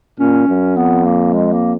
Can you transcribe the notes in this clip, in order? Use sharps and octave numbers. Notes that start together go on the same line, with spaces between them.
A#2 C#4
F#2
F2 B3
A#3
G#3
A#3